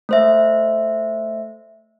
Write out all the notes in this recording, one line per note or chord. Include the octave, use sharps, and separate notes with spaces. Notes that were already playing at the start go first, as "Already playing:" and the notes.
A3 C5 E5